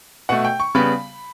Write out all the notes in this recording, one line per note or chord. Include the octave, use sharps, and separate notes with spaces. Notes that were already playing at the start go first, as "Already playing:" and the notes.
B2 A3 F#5
G5
C#6
C#3 G3 B3 B5